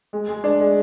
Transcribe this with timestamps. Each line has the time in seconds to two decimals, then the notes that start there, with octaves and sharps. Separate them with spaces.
0.13 G#3
0.28 G#3
0.44 D4
0.60 G#3